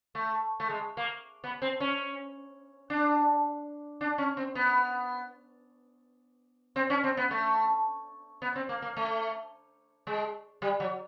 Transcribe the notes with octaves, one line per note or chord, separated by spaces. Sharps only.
A3
A3
G#3
A#3
B3
C4
C#4
D4
D4
C#4
C4
B3
C4
C#4
C4
B3
A3
B3
C4
A#3
A#3
A3
G#3
G3
F#3